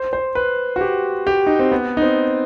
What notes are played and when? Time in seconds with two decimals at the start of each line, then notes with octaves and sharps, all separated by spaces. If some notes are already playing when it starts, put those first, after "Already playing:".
Already playing: C5
0.13 C5
0.35 B4
0.76 F#4
0.81 G4
1.27 G4
1.47 D#4
1.59 C4
1.72 B3
1.97 D#4
2.02 C4